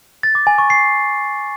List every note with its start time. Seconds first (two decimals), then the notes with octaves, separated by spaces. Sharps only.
0.23 A6
0.35 D6
0.47 G#5
0.58 C#6
0.70 C7